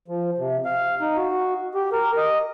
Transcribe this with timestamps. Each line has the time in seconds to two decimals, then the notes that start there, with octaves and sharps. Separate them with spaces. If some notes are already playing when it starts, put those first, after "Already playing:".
0.08 F3
0.38 C3
0.65 F5
1.01 D#4
1.17 F#4
1.74 G4
1.92 A#4
2.17 D#5